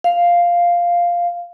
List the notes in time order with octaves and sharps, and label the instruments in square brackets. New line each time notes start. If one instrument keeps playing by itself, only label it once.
[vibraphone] F5